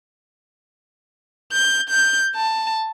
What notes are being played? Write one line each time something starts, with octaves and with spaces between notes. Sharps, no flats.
G6
G6
A5